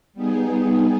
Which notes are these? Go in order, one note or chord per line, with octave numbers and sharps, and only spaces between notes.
G3 B3 D#4 G#4